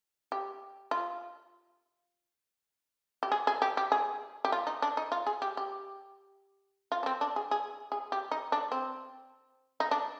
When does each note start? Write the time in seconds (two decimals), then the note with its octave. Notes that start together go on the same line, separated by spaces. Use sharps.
0.32 G4
0.91 F4
3.23 G4
3.32 G#4
3.47 G#4
3.62 G4
3.77 G4
3.92 G#4
4.45 G4
4.52 F4
4.67 D#4
4.82 D4
4.97 D#4
5.12 F4
5.27 G#4
5.42 G4
5.57 G4
6.92 F4
7.03 D4
7.06 C4
7.21 D4
7.36 G#4
7.51 G#4
7.92 G#4
8.12 G4
8.31 D#4
8.52 D4
8.72 C4
9.80 D#4
9.91 D4